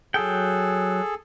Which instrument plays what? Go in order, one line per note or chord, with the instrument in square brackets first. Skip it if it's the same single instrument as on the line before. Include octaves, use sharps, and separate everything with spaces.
[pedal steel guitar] F#3 G5 [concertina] G#4 A4